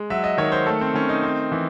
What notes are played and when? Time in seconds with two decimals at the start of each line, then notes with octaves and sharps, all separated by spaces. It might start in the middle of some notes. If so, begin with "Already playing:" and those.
Already playing: G#3
0.10 F#3 E5
0.24 D#5
0.38 D#3 C#5
0.52 C5
0.66 A3 A4
0.81 C4
0.94 D#3 C#4
1.09 D#4
1.23 C4
1.52 E3